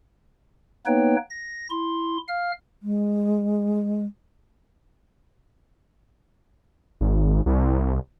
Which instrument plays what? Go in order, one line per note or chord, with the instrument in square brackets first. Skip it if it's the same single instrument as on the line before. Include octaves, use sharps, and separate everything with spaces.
[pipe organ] A#3 B3 D#4 B4 C#5 G5
A#6
E4 C6
F5 F6
[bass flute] G#3
[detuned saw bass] G#1
C2